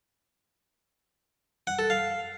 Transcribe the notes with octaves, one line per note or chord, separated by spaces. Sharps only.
F#5
A4
F5